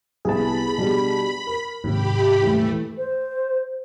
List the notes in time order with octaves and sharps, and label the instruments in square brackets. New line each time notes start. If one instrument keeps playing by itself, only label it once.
[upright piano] C2 B3 G#5 [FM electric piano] G#4 A5 [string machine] B5
[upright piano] B2 G3 D4
A#4
[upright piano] D#2 [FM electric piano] G#2 C3 [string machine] G4 B5
[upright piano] D#1 E3 [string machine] A3
[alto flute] C5